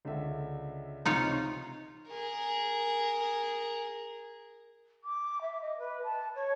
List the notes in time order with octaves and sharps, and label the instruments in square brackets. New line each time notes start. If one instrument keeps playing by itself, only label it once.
[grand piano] C#2 D3 E5
[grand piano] C#2 C3 [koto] D#4 F4 C#5
[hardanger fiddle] G#4 A#4
[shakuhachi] D6
E5
D#5
B4
A5
C#5